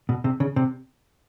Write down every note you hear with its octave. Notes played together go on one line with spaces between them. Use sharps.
B2
C3
C#3
C3